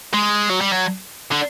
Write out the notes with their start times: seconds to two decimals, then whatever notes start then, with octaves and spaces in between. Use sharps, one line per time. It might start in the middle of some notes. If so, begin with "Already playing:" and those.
0.14 G#3
0.50 F#3
0.61 G3
0.72 F#3
1.32 D3